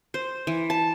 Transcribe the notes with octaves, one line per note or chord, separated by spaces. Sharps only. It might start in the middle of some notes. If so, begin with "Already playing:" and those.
C5
E3
A5